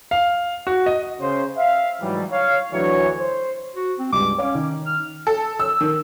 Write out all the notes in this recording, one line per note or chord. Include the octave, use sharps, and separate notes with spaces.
F5
F#4
D#5
C#3 C5
E5 F5
G#2 E3 F#3 G3
C#5 F5
D2 E3 F#3 C#5
C5
F#4
C4
C#2 G2 G3 D6
C#4 C#5 F5 D6
D#3
F6
A4
E6
D#3